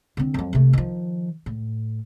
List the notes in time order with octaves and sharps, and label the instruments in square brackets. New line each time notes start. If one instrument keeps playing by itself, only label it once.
[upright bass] D3 C4
F2 F#3
C3 A3
D#3 F3
A2